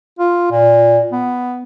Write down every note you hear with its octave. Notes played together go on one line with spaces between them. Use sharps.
F4
A#2
B3